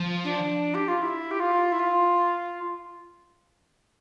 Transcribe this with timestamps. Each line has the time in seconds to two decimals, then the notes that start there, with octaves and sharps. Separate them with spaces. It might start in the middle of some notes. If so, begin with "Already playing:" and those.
Already playing: F3
0.24 D4
0.74 G4
0.88 F4
1.02 E4
1.31 G4
1.40 F4
1.72 E4
1.79 F4